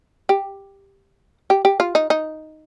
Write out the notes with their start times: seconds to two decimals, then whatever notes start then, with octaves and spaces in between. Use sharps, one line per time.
0.29 G4
1.50 G4
1.65 G4
1.80 F4
1.95 D#4
2.10 D#4